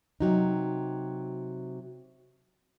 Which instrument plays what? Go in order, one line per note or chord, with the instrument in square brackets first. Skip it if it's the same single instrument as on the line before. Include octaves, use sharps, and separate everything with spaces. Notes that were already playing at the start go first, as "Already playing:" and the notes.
[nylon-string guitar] C3 F#3 D#4